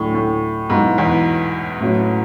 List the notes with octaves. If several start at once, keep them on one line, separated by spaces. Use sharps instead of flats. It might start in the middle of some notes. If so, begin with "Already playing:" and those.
Already playing: D2 A2 D3 F#3
A2
G#2 B2 F#3 B3 E4
E2
A2 F#3 A3 C#4 F#4